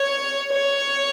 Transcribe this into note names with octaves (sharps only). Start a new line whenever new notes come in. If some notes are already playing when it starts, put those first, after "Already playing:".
Already playing: C#5
C#5